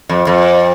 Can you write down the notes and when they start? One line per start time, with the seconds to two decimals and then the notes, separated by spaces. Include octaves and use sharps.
0.09 F2
0.27 F2